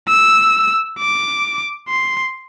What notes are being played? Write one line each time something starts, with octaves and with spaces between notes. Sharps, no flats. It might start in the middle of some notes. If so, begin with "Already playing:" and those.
E6
D6
C6